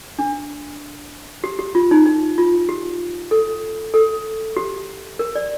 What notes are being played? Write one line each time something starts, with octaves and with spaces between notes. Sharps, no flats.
D4
G4
G4
F4
D#4
D#4
F4
G4
A4
A4
G4
A#4
D5